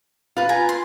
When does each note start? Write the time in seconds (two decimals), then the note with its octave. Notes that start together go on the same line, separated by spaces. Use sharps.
0.37 F4 B4
0.49 G#5 A#5
0.69 C6